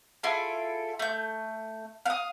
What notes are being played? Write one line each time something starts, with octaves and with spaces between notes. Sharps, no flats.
E4 F4 G#4 A4
A3 G6
F5 D#6